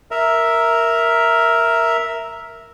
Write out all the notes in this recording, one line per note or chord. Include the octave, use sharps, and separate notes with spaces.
A#4 E5